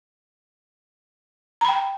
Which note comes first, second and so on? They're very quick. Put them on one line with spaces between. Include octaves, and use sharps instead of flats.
A#5 B5 G5